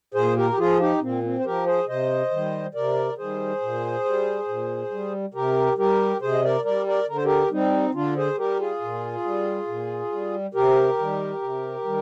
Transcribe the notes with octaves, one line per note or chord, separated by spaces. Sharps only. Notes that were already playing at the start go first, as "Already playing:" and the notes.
A#2 G#4 C5
G4 A#4
G4
F3 F4 G#4
D#4 G4
A#2 C4
C4
C5
F3 G4 A#4
G#4 C5
C3 C5 D#5
D#3
G3
C3 A#4 D5
D#3 G3 G#4 C5
A#2
G3
A#2
G3
C3 G4 A#4
G3 G4 A#4
C3 G#4 C5
D#5
A#4 D5
G3 A#4 D5
A#4 D5
D3 A#4
C5
G4 A#4
G3 C4 D#4
D3 D4 F4
G#4 C5
G3 G4 A#4
F4 G#4
A#2
G3
A#2
G3
C3 G4 A#4
D#3 G3
C3
D#3 G3